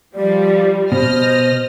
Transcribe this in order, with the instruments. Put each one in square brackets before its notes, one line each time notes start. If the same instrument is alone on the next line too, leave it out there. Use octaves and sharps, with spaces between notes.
[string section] F3 G3 [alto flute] D5
[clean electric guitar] B2 [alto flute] C5 [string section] D#5 F6 A#6